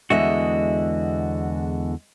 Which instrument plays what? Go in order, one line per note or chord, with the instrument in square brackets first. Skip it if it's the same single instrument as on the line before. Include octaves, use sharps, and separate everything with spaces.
[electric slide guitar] E2 D3 F#4 [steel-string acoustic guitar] G#3 D#5 E5